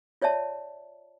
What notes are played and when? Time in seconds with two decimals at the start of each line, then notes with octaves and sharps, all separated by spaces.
0.22 F4 C#5 D5 E5 A5